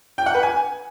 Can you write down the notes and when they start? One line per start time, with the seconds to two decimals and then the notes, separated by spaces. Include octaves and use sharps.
0.18 G5
0.26 F#5
0.35 B4
0.43 G#5